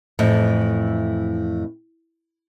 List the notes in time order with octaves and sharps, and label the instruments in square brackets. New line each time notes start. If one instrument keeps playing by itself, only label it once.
[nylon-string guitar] F2 A2 E3